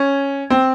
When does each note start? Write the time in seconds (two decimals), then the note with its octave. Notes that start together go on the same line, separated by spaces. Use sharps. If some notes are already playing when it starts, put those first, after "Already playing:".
Already playing: C#4
0.50 C4